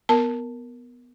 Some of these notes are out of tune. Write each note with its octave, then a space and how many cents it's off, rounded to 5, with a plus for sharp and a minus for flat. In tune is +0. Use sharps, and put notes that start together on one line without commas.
B3 +0 A#4 +0 A5 +0